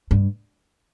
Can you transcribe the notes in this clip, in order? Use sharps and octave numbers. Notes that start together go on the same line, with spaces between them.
G2